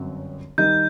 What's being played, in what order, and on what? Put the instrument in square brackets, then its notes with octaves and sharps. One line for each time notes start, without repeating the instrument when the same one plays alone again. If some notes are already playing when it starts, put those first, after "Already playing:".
Already playing: [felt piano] G1 F#2 F#3 C4
[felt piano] D#3 G3 D#4 [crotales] G6